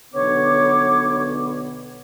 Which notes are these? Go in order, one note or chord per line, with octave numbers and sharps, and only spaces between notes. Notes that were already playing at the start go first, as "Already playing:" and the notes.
B1 D3 B3 C#5 D6